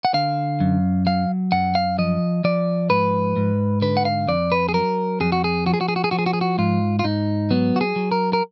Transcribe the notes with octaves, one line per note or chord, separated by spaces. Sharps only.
F#5
D3 F5
F#2
F#3 F5
F#2 F#5
F5
F3 D#5
F3 D5
G#2 B4
G#2
D3 B4
F#5
F5
F2 D5
B4
G#4
F#3 A#4
F2 G#4
F#4
G#4
F3 F#4
G#4
F#4
G#4
F#4
G#4
F3 F#4
G#4
F#4
G#4
F#4
G#2 F4
F4
G#2 D#4
F#3 B3
F#4
G#4
F#3
A#4
A#4